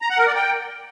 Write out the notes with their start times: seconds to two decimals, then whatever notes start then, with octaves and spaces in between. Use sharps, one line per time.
0.02 A#5
0.10 F#5
0.18 A#4
0.27 D5
0.35 G5